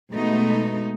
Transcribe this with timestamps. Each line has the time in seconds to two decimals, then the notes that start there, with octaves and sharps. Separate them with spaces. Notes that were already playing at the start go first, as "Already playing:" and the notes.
0.13 B2 G#3 A3 B3 D#4